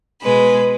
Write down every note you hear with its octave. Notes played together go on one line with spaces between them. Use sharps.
B2 G#3 B4